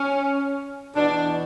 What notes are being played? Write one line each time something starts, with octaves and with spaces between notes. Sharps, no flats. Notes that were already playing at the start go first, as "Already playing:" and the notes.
Already playing: C#4
E2 B2 D4